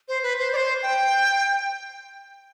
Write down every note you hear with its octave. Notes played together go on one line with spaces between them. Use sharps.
C5
B4
C5
D5
C5
G5